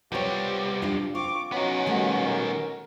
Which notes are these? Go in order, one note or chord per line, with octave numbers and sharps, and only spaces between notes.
C2 G3 B3 C4 F4 C#5
D4 F4
C4 F4 C#6 D6
F#3 B3 C#4 D#4 F#4
B2 D#3 G3 A3
A#4